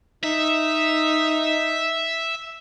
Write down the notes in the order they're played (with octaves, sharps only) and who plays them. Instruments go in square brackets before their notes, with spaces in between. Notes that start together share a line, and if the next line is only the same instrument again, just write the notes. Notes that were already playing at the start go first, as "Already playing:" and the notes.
[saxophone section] D#4 [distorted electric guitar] E5